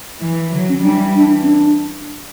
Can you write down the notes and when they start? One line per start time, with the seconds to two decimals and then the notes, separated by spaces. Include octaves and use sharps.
0.21 E3
0.52 D3 F#3
0.69 C#4
0.84 E3 G3 D4
1.16 E3 D4
1.43 C#4
1.47 D4